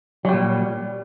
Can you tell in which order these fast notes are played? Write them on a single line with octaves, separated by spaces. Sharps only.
F#3 G3 A#2